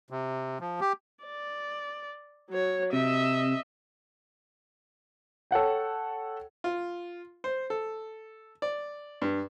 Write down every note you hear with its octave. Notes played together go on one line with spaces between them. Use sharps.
C3
F3
G4
D5
F#3 C#5
C3 D#5 E5
A4 C#5 F#5 G5
F4
C5
A4
D5
G2